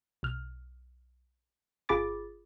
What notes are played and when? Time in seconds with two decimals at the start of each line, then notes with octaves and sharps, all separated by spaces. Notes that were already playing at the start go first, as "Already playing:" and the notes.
0.23 B1 F6
1.89 G1 F4 G#4 B5 D6 A6